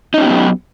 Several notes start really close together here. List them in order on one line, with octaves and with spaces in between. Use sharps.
D#4 C#4 G4 B3 F#3